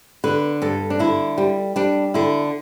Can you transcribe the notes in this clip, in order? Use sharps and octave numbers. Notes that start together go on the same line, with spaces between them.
D3 B4
G2 A4
D4
D3 E4
G3
G3 D4
D3 E4